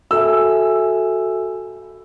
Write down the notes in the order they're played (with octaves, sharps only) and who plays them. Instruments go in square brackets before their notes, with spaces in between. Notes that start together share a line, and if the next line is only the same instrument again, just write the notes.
[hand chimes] F#4 A4 E5 G#5 [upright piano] E6